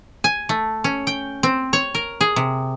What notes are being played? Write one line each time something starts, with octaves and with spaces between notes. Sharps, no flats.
G#5
A3
C#4
G5
C4
C#5
A#4
G#4
C3